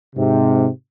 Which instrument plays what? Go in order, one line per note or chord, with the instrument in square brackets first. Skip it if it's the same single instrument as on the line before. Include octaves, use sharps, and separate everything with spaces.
[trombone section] G#2 C3